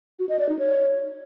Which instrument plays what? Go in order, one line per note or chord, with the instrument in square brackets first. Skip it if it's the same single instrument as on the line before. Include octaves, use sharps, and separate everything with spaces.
[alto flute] F#4
D#5
D5
D#4
C#5